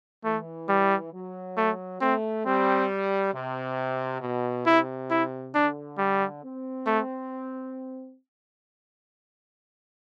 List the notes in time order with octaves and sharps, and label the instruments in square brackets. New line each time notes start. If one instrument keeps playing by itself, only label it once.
[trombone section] E3 [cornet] A3
[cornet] G3
[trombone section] F#3
[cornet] A3
[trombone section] A3 [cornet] C4
[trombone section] G3 [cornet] C4
[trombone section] C3
B2
[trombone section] C3 [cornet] E4
[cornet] E4
[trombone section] D3 [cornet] D4
[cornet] G3
[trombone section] C4
[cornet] A3